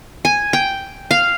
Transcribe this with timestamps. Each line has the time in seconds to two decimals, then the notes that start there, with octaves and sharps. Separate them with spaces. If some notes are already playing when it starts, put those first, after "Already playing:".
0.25 G#5
0.53 G5
1.11 F5